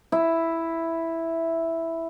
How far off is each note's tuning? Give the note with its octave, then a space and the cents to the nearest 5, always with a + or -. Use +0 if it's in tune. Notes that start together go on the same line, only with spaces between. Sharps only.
E4 +0 E5 +0